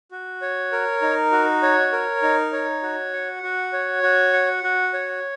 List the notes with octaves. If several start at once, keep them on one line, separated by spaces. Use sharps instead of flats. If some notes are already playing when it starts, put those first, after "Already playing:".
F#4
C#5
A#4
D#4
F#4
C#5
A#4
D#4
C#5
F#4
F#5
F#4
C#5
F#4
F#5
F#4
C#5